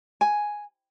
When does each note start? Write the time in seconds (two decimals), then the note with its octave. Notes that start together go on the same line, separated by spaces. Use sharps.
0.21 G#5